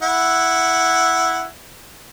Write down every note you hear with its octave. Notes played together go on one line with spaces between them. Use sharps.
E4 F#5